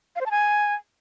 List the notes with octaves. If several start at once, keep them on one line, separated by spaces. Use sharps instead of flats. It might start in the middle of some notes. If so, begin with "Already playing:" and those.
F5
C5
A5
G#5